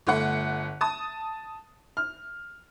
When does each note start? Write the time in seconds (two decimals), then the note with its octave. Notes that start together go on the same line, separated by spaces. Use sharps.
0.07 G1 A3 F#5
0.81 A5 D#6
1.97 F6